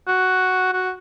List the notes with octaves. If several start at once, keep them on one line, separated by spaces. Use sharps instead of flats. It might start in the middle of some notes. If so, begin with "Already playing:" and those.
F#4
F#4